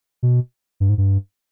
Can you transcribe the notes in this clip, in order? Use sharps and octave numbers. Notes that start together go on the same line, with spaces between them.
B2
G2
G#2
G2